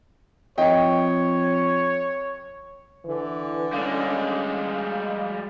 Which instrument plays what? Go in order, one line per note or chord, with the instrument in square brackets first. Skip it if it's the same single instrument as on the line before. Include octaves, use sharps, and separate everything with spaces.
[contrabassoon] F2 [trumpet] C#5 [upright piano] D#5 G5
[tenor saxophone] D3 [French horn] E3
[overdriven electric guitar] G3 G#3 [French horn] C#4 [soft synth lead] F5